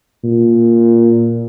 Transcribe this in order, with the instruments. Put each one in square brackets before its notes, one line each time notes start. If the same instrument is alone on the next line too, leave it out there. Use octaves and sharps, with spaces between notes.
[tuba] A#2